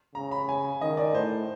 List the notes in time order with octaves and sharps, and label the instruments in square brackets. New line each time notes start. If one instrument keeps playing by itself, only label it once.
[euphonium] C#3 [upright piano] A#5
[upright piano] B5
G#5
[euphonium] D#3 [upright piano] D#5
[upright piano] D5
[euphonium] A2 [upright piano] C5